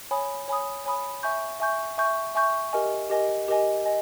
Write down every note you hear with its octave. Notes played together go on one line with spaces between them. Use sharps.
C#5 G#5 B5 D#6
C#5 G#5 B5 D#6
C#5 G#5 B5 D#6
E5 G#5 C#6 G6
E5 G#5 C#6 G6
E5 G#5 C#6 G6
E5 G#5 C#6 G6
G4 A#4 D#5 G#5
G4 A#4 D#5 G#5
G4 A#4 D#5 G#5
D#5 G#5